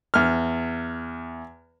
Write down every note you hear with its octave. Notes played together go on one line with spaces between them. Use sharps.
E2 F6